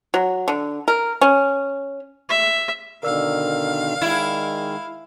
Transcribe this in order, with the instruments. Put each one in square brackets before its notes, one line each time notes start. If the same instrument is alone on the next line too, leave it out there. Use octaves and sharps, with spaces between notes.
[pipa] F#3
D3
A#4
C#4
[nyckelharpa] E5
[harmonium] B2 D3 D#3 [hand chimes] A#4 D5 E6 [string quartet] F5
[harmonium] D#3 G#3 [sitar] E4